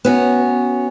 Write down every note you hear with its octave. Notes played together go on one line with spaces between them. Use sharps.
B3 C#4 F#4